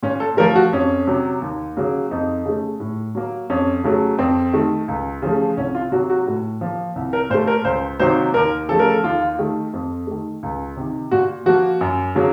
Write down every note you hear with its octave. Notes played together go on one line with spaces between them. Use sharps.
A#2 C#4
A4
F3 A3 A#4
F#4
F2 C#4
C3 F#3
D#2
C#3 F#3 A#3
F2 D#4
C#3 A3
A2
F#3 A#3
F2 C#4
C#3 F#3 A3
F2 C4
D#3 A3
C#2
C#3 F3 A3
C2 C#4
F4
C3 F#3 A#3 F#4
F#4
A2
F3 A#3
C2
A#4
A#2 A3 C5
A#4
C#2 C5
C3 D#3 F#3 A#3 C5
D#2 A#4
C#3 F3 A3 A4
A#4
A4
D#2 F4
D#3 A3
F2
D#3 A3
C#2
C3 D#3
A#2 F#4
F3 A#3 F#4
F#2
C#3 F#3 A#3